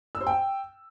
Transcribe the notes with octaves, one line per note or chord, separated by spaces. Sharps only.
E6
C5
G5